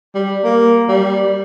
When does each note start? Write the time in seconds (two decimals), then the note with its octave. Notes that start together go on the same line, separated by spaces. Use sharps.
0.15 G3
0.44 A#3
0.88 G3